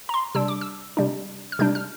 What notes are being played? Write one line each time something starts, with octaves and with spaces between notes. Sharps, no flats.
A#5
C6
C3 G3 D4 E6
D6
E6
C3 G3 D4
F6
C3 G3 D4 G6
F6